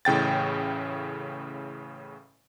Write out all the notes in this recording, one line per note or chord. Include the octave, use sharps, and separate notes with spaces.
A1 A2 C#3 G5 A6